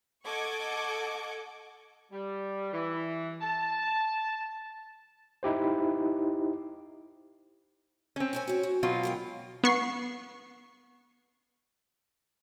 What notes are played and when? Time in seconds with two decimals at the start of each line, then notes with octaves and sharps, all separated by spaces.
0.24 A4 D#5 F#5 C#6 D6 G#6
2.12 G3
2.73 E3
3.41 A5
5.43 D#4 E4 G4 C5
8.16 C4 C#4
8.33 A#4 C#5 G#5
8.48 F#4 C#5
8.63 F#4
8.83 B2 F#3 C4 F4
9.03 G#2 A#4 G5
9.64 B3 C#6 C7